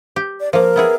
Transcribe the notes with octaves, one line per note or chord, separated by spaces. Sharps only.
G4
D5
F3 A#3 A#4
B3 E4 G#4